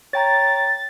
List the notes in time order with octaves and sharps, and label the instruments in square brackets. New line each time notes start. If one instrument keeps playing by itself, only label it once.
[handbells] C#5 G5 A#5 [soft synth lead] A6